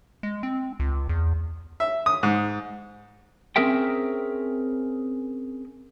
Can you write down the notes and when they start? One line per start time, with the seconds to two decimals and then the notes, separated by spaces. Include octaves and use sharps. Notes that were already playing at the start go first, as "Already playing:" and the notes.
0.23 G#3
0.43 C4
0.80 C#2
1.09 E2
1.80 E5
2.06 D#6
2.23 G#2
3.56 C4 C#4 G#4 A#4 E5 G5